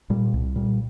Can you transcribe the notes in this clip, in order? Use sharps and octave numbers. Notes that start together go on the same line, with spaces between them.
A#2 G3
C2
A#2 G3